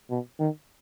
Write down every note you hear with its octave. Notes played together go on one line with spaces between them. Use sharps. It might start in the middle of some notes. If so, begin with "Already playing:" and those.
B2
D#3